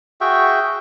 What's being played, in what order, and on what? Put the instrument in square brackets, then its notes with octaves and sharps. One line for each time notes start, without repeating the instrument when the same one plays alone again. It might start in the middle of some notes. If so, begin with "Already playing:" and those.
[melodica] F#4 G#4 E5 G5